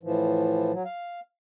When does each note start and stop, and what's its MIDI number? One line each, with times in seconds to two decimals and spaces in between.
0.03 0.72 45
0.03 0.72 52
0.03 0.72 53
0.72 0.83 54
0.85 1.20 77